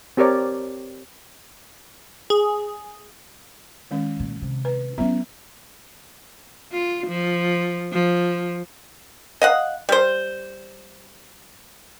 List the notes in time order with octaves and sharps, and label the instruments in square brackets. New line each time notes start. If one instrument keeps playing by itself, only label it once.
[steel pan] C4 G4 A#4 C#5 D5
[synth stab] G#4
[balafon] D#3 G#3 C#4
[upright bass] A#2
C3
[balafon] B4
[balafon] F#3 B3 E5 [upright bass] C#4 E4
[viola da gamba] F4
F3
F3
[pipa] D#5 F5 F#5
G3 C5